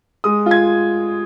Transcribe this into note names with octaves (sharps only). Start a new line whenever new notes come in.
G#3 D#6
F4
G#6